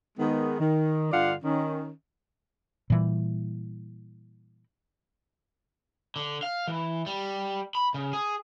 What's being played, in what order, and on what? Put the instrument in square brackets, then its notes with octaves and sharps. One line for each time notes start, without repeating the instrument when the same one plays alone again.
[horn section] D#3 G#3 B3
D#3
G2 D3 F4 D5 F5 F#5
D#3 C#4
[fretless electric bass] A#2 E3 G3
[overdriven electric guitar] D3
F5
E3
G3
B5
C#3
G#4